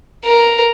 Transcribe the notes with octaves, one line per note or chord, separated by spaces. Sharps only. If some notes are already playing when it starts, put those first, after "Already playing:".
A#4